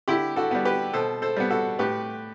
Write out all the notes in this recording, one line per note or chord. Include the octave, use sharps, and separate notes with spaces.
D3 E4 G4
F#4 A4
G3 B3
G4 B4
B2 A4 C5
A4 C5
G3 B3
F#4 A4
A2 G4 B4